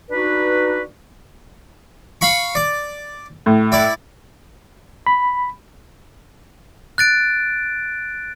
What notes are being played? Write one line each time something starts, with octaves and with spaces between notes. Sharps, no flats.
D4 D#4 F#4 B4
F5 B5 C#6
D5
A2
E4 D5
B5
F#6 A6 D7